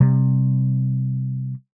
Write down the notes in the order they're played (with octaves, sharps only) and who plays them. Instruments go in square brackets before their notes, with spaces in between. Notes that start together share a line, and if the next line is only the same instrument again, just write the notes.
[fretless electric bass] C3 G3 C4